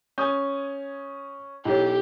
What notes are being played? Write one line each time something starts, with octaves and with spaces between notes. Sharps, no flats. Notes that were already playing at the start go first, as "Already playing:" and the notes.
C#4 G#5 D#6 G6
B1 E4 G4 C#5